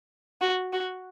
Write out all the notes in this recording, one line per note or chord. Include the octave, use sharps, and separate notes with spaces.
F#4
F#4